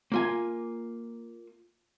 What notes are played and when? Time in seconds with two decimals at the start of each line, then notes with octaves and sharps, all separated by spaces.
0.12 A#3 F4 G#5